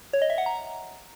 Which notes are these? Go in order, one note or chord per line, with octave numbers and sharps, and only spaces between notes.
C#5
D#5
E5
F#5
A#5